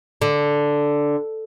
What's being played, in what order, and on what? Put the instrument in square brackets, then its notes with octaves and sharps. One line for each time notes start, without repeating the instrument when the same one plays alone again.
[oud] D3